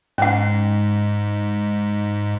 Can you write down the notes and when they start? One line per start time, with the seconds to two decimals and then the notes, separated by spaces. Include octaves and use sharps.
0.18 G#2 C#4 F#5